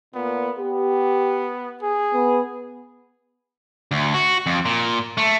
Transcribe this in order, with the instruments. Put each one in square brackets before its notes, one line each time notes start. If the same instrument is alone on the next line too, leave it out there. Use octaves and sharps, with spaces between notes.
[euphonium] A#2 [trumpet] B3
[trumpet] B3 [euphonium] G4
[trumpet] G#4
[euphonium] B3
[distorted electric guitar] D2
F#4
F2
A#2
A3